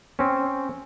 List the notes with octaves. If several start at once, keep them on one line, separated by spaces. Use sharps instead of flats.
C4 C#4